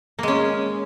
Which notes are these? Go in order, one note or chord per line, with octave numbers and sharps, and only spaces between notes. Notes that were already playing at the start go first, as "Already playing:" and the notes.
G#3 A#3 C#4